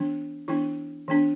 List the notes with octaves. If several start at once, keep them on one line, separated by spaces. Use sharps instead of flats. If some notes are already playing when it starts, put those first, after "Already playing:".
Already playing: E3 B3 D4
E3 B3 D4 E4
E3 B3 D4